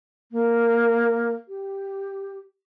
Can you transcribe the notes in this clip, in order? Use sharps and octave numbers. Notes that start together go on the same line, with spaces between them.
A#3
G4